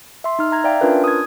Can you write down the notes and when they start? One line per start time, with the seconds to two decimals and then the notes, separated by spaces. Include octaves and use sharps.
0.24 E5 C6
0.39 D#4 F6
0.52 A#5 G#6
0.64 D5 E5 F5 G5
0.81 C#4 D4 F4 A#4 B4
1.04 D#6 G#6